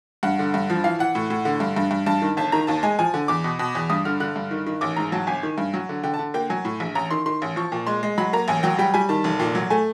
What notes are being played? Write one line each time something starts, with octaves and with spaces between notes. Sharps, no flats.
G2 F#5
D3
G2
F3
E3 F5
E3 F#5
A2
A2
D3
G2
G2
G2
G2 A5
D#3
G1 A5
D#3 A#5
D#2 A5
G#3 G#5
F3 G#5
D3
E2 D6
B2
B2
E2
G2 D#6
D3 F6
D3 F#6
G2
D#3
D#3
A1 D6
G#2 A#5
F#3 A5
G1 G#5
D#3
G2
F#3
D3
D3 G5
A5
D3
A#3 G5
F#3 G#5
A2
A#1
A1 A#5
D#3 C6
D#3 C6
A1
F3 C#6
A#2
G#3 C6
G#3
F#3 B5
A#3 A#5
A1 G#5
F#3 G5
G3 G5
G3 G#5
D#3 A5
F1
A#2
F#3
A3 G#5